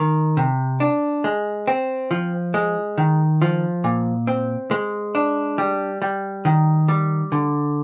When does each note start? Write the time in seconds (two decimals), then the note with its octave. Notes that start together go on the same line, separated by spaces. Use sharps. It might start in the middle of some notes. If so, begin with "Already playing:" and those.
Already playing: D#3
0.37 C3
0.80 D4
1.24 G#3
1.68 C4
2.11 F3
2.54 G#3
2.98 D#3
3.42 F3
3.84 A#2
4.27 C4
4.71 G#3
5.15 D4
5.58 G3
6.02 G3
6.45 D#3
6.88 G3
7.32 D3